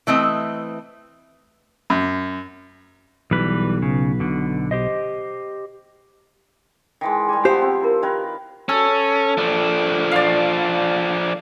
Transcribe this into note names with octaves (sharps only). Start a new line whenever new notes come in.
E3 A3 C4 D#5
F#2
B1 E3 G3 B4
C#3
B2 D3
G4 C5 D#5
D#3 E3 G#3
G3 G#4 G#5
F3 B3 G4 C5
C4
E4 F4 A#4
D#3 A#4 B4 D5 B5
C#4 A4
F3 D4
D5 F5